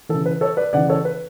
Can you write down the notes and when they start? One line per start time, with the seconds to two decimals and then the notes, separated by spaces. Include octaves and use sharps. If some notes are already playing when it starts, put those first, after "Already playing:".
0.09 E3 A4
0.14 C#3
0.26 B4
0.41 A4 C#5
0.57 B4 D5
0.73 C#3 E3 D5 F#5
0.89 A4 C#5
1.05 B4